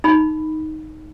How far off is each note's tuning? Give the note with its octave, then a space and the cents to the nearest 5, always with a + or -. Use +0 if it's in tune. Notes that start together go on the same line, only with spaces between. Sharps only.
D#4 +0 B5 +0